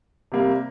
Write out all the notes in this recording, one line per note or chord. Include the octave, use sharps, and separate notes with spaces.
C3 G3 A#3